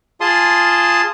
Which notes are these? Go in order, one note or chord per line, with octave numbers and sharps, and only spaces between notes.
F4 G#4 A5 C6 D#6